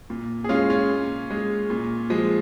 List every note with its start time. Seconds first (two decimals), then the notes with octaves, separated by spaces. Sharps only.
0.10 A#2
0.44 G#4
0.49 G#3 C#4 F4
0.70 C#4 F4
0.90 A#2
1.30 G#3
1.70 A#2
2.10 F3 G#3